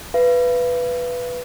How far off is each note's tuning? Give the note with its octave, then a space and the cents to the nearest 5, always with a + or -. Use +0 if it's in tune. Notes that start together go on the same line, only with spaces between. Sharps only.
B4 +0 F5 -40